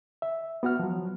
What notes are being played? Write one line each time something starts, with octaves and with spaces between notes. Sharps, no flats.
E5
B3 F#4 F#5 F6
F3 F#3